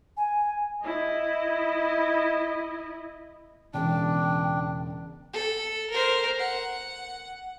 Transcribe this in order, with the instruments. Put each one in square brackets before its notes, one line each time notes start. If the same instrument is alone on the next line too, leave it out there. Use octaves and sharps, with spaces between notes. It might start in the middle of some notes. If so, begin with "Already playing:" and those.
[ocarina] G#5
[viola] E4 D#5
[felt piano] E1 E2 C#3 [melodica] D4 [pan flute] G5
[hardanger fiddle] A4
A#4 C5
F#5